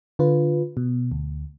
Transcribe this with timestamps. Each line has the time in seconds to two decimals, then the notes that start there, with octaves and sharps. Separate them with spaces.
0.19 D3 F4 B4
0.77 B2
1.12 D2